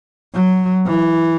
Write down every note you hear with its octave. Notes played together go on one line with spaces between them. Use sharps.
F#3
E3